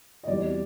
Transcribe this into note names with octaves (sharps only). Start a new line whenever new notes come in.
D#5
E2 B2 G3 C4 D5